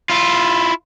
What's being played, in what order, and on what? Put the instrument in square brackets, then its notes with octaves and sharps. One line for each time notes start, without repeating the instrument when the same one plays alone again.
[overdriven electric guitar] E4 F4